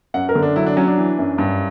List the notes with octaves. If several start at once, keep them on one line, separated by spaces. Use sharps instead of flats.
F#2 F#5
A#4
D3
D4
F#3 E4
D4
F#3 C#4
D4
E3
F#2
G2